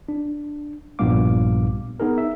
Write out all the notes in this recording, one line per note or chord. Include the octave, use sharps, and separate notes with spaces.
D4
A#1 G2 A#2 B3 F5 D6
B3 D#4 G#4 A#4
E5